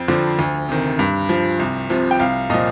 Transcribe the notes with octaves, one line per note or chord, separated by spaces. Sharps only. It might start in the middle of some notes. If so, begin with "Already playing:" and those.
Already playing: F2 G5
D3 F3
D2
C3 D#3
G2
F3
C2
C3 F3
G5
C2 F5
A#2 F3 D#5